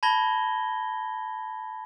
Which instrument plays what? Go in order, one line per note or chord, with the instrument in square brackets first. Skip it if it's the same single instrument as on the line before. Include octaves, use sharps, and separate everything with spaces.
[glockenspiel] A5 B5 G#6 A#6 G7